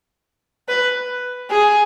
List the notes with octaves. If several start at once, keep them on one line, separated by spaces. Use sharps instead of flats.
B4
G#4